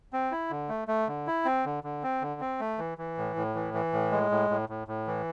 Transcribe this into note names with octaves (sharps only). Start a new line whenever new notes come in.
C4
E4
D3
A3
A3
D3
E4
C4
D3
D3
C4
D3
C4
A3
E3
E3
A2
A2
E3
E3
A2
G#3
A2
A2
A2
A2
E3